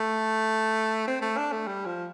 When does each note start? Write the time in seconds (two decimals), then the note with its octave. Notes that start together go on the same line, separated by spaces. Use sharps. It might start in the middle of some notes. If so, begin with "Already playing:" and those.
Already playing: A3
1.08 C4
1.22 A3
1.38 D4
1.52 A3
1.67 G3
1.86 F3